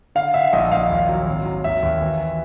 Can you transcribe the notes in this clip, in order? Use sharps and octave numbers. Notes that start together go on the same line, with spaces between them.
D3 F5
D3 E5
A#1 D#5
A#1 F5
D#2
F#3
G#1
F#3
D#2 E5
D#2
E3